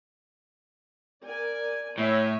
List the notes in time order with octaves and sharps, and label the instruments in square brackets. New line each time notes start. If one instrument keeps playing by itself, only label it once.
[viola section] A#4 D5 G#5
[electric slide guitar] A2 [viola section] C#5 E5 G#5